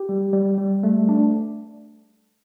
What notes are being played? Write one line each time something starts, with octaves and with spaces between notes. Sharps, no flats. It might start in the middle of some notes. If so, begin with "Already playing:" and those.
Already playing: G4
G3
G3
G3
A3
D4